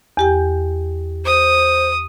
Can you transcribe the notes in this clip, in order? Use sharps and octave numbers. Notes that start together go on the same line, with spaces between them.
E2 G4 G5
C5 D#6